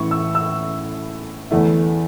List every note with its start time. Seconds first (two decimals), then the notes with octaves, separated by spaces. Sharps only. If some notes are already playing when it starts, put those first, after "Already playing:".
Already playing: A2 E3 C#4 E4 C#6
0.11 E6
0.35 E6
1.51 E2 E3 A3 E4